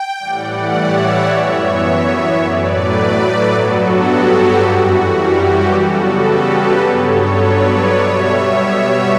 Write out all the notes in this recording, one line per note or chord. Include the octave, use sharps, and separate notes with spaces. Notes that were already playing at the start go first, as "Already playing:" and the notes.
Already playing: G5
A2 E3 G3 D5 F#5
C#5 E5
F#2 E3 B3 C#5 E5
A2 F#3 A3 B4 D5
G2 F#3 B3 F#4 A4
G4
F#2 E3 G3 F#4
G4
C#3 G3 B3 F#4 A4
G4 B4
G2 F#3 B3 A4 C#5
B4 D5
B2 G3 B3 C#5 E5
C#5 E5